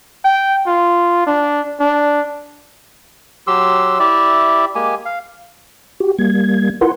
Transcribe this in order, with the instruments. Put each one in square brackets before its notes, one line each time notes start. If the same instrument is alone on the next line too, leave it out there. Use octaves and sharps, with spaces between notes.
[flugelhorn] G5
F4
D4
D4
[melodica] F#3 G4 C6 E6
E4 G4 D5 E5
G#3 A#3 G4 G#5
F5
[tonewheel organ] F#4 G4
G3 A#3 G#6
E4 F4 A#4 B4 F#5 C6